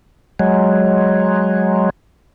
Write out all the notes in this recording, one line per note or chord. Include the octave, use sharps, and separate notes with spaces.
F#3 G#3